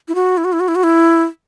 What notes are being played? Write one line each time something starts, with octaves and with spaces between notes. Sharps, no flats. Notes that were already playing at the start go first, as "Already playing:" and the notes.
E4
F#4
E4
F#4
E4
F#4
E4
F#4
E4